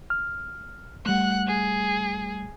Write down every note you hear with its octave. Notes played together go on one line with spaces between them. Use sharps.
F6
G3 A3 F#5 F#6
G#4